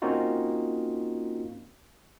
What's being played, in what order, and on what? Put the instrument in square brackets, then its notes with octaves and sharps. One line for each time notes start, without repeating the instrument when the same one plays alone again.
[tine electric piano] A#3 C4 C#4 D#4 F4 F#4